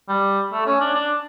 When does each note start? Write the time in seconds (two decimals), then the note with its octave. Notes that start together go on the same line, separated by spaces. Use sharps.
0.09 G3
0.52 A3
0.66 C#4
0.81 D4
0.95 D4